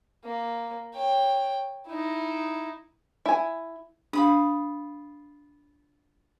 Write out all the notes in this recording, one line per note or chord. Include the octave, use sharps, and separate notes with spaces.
A#3
C#5 G5
D#4 E4
E4 G#5
D4 F4 B5 D#6